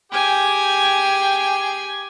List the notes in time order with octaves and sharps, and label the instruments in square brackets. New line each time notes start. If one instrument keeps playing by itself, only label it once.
[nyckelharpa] G4 G#5 [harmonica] G#4 G5